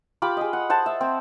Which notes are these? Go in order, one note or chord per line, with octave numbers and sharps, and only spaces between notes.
F4 G4 B5 D6
G#4 D#5
F#5
C5 F#5 A5
E5
C4